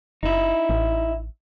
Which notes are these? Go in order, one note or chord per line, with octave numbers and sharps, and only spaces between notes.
F#1 D#4 E4
A1